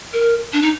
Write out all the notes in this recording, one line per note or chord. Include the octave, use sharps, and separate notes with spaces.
A#4
D4
D#4